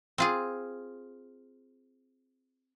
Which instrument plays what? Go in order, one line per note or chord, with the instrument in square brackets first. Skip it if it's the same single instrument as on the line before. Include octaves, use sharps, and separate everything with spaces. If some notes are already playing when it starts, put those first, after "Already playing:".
[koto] C4 F4 G#4